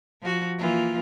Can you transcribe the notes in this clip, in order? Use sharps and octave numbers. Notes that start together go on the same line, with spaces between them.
F3 F#4
E3 A#3 F4